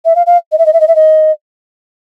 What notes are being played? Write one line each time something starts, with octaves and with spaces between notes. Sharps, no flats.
E5
F5
F5
D#5
E5
D#5
E5
D#5
E5
D#5